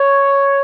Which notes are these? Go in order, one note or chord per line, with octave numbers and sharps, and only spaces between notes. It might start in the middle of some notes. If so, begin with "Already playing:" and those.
Already playing: C#5